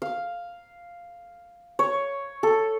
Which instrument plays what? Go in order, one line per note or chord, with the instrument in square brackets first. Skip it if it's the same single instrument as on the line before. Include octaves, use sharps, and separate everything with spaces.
[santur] F5
C#5
A4